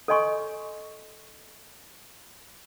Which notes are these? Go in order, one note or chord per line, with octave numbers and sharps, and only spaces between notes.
A4 C#5 D#5 G#5 C6 C#6